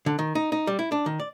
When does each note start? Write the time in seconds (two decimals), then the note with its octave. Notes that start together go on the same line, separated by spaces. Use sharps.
0.06 D3
0.19 D#3
0.35 D#4
0.52 D#4
0.67 G3
0.79 E4
0.92 D4
1.06 D#3
1.20 D5